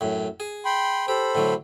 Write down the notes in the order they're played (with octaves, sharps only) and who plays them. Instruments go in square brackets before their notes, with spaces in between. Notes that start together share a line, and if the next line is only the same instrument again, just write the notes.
[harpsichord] F#2 A2
G#4
[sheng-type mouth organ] G5 B5 C6
[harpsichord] G4 [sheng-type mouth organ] A4 C5 B5
[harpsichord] A2 D3 F#3